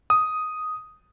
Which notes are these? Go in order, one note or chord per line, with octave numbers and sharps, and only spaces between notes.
D#6